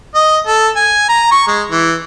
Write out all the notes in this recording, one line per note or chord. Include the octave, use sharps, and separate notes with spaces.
D#5
A4
G#5
A#5
C#6
G#3
E3